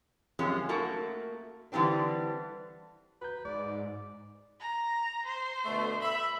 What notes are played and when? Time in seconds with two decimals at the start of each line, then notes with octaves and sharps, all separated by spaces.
0.39 F#2 C3 F3 G#3 C#4
0.69 A3 A#3 F#4 A4
1.72 D3 E3 G3 C4 D4
3.22 F#4 B4 A#5 G6
3.45 G#2 G#3 D5
4.60 A#5
5.25 C5
5.65 B2 D3 A3
6.02 E5 B5